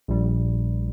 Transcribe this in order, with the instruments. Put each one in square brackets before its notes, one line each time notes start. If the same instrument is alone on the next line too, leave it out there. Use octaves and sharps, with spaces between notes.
[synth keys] A#1 A#2 G3